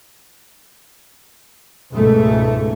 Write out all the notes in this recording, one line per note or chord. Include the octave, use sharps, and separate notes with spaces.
C#2 G#2 B2 A3